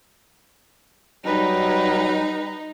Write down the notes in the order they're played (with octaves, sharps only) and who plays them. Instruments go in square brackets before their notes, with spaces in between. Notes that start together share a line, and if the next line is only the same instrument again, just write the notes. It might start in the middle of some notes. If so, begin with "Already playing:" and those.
[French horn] F#3 [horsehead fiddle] G3 B4 [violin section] D#4